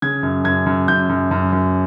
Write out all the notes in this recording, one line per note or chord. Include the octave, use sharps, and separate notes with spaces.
C#3 G#6
F#2
F#2 G#6
F#2
F#2 G6
F#2
F#2
F#2